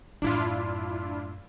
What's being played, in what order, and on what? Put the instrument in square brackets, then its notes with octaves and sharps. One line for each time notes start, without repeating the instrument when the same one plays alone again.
[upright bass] F#2 A2 [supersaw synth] D4 E4 F4